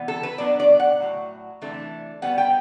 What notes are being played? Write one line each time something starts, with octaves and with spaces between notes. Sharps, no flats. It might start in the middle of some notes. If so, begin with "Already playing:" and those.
Already playing: C3 E3 G3 B3
A4
B4
B2 F#3 B3 D4 D5
D5
F#5
A2 F#3
C3 E3 A3 D4
B2 G3 B3 F#5
G5